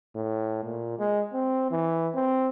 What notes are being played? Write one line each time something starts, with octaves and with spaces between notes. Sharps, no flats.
A2
A#2
G#3
C4
E3
C4